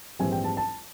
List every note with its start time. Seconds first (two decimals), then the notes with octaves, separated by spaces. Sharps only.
0.19 A#1 G#2 E3 G3 C4 G#5
0.32 G5
0.44 A5
0.57 A5